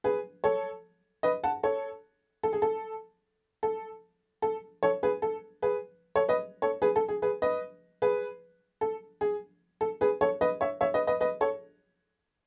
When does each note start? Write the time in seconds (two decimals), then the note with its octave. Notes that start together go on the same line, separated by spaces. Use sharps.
0.04 G#4 B4
0.44 A4 C#5
1.23 B4 D#5
1.44 F#5 A5
1.63 A4 C#5
2.43 A4
2.53 G#4
2.62 A4
3.63 A4
4.42 A4
4.83 A4 C#5
5.03 G#4 B4
5.22 A4
5.62 G#4 B4
6.16 A4 C#5
6.29 B4 D#5
6.62 A4 C#5
6.82 G#4 B4
6.96 A4
7.09 G#4
7.22 G#4 B4
7.42 B4 D#5
8.02 G#4 B4
8.81 A4
9.21 G#4
9.81 A4
10.01 G#4 B4
10.21 A4 C#5
10.41 B4 D#5
10.61 C#5 E5
10.81 C#5 E5
10.94 B4 D#5
11.07 B4 D#5
11.21 B4 D#5
11.41 A4 C#5